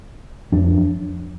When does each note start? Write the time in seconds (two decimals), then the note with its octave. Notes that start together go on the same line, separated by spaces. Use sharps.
0.52 F2 F3 D4